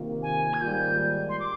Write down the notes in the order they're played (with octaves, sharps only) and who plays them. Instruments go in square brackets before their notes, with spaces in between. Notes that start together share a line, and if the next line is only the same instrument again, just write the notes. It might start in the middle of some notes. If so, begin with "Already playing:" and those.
Already playing: [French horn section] C3 D#3 A#3 F4
[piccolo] G#5
G#6
[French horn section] G#2 D#3 G3 A#3 F4 [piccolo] G6
[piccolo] C6
D6